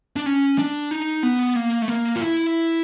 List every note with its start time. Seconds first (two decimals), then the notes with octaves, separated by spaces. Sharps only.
0.16 D4
0.26 C#4
0.59 D4
0.91 D#4
1.23 B3
1.56 A#3
1.82 A3
1.88 A#3
2.16 F4
2.20 E4